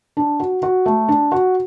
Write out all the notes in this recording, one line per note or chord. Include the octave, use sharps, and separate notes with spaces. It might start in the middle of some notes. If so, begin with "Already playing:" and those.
D4
F#4
F#4
A3
D4
F#4